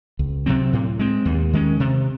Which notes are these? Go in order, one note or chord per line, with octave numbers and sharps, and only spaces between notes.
C#2
C3 F#3 C4
A2
G#3 C4
D#2
D#3 G#3 C#4
C3